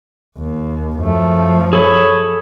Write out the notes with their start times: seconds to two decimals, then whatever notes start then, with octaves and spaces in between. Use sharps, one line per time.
0.37 D#2
1.01 F#2 F3 A3
1.73 G#4 A4 C#5 B5